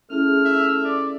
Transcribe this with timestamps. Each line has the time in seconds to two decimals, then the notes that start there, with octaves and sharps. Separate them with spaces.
0.10 A3 C#4 E4 G#4 F6
0.45 E5
0.84 D5